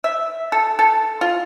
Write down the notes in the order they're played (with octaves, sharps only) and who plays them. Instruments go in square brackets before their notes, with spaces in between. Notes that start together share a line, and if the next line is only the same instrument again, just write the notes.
[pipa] E5
A4
A4
F4